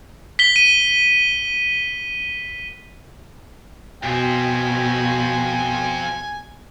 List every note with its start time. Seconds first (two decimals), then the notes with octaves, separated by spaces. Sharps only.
0.39 B6 G7
0.56 D#7
4.03 F2 B2 C4 G#5